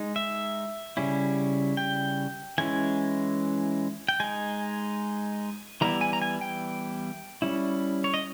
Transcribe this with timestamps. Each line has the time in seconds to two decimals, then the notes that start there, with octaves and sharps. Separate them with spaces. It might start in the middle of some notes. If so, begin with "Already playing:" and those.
Already playing: G#3 D#4
0.16 E5
0.97 C#3 G3 C#4 E4
1.77 G5
2.58 E3 G#3 C#4 E4 G#5
4.08 G5
4.20 G#3 D#4 G#5
5.81 E3 G3 B3 E4 A#5
6.01 G#5
6.13 A#5
6.22 G#5
6.41 G5
7.42 G3 C#4 E4
8.04 C#5
8.14 D#5